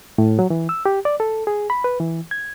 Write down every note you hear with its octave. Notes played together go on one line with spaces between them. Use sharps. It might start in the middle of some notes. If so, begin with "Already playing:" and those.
A2
F#3
E3
E6
G4
D5
A4
G#4
B5
B4
E3
G#6